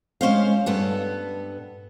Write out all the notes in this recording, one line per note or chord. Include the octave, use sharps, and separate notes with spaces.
G#3 C#4 C5 F5
G2 B3 A4